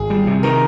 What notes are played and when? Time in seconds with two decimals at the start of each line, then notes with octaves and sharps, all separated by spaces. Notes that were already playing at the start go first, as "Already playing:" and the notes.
Already playing: G#1 G#4
0.10 G3
0.27 C3
0.43 D#3 A#4